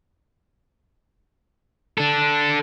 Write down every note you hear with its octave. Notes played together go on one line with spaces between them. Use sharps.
D4 A4